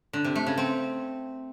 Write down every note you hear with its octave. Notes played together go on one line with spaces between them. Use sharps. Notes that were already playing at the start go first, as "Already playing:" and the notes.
D3
C3
A3
C#3
C4